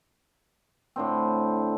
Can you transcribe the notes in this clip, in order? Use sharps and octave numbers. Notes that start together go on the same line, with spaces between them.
A2 D3 C4